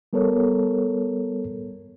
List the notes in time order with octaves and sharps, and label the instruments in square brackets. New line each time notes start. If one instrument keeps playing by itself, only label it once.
[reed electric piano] G3 B3 A4 A#4 C#5